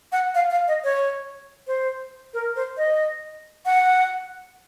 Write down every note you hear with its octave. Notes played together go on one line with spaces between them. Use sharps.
F#5
F5
F5
D#5
C#5
C5
A#4
C5
D#5
F#5